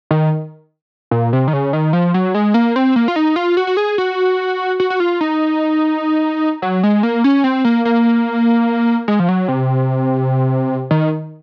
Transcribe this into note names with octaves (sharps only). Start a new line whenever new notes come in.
D#3
A#2
C3
D#3
C#3
D#3
F3
F#3
G#3
A#3
C4
A#3
F4
D#4
F4
F#4
F#4
G#4
F#4
F#4
F#4
F4
D#4
F#3
G#3
A#3
C#4
C4
A#3
A#3
G#3
F3
F#3
C3
D#3